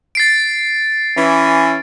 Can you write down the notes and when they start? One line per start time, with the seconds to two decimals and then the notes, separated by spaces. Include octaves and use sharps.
0.15 A6 C7 D7
1.16 E3 C#4